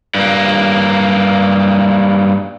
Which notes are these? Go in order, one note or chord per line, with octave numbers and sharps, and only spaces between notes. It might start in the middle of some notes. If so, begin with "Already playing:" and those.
G2 A#3